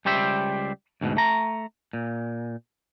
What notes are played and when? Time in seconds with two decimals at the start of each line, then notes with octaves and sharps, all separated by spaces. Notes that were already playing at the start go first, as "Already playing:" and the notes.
0.05 C#2 G3 G4 C5 E5
1.01 D2 G#2 B2
1.17 A3 A#5
1.93 A#2